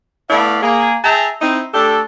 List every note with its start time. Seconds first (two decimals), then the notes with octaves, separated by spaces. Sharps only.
0.30 A3 B3 E4 D5 F5 B5
0.63 A#3 G#4
1.04 G#4 E5 G5 A5 A#5
1.42 C4 D#4 E4
1.74 A3 D4 G4 A4